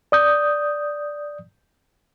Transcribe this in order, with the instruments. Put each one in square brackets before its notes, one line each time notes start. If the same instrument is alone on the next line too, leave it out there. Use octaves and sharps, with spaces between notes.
[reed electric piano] D5 D#6 G6